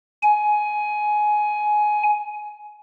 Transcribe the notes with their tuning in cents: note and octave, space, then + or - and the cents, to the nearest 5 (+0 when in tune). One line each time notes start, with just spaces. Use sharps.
G#5 +15